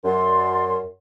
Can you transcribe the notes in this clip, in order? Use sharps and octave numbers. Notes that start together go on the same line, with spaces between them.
F#2 D5 C6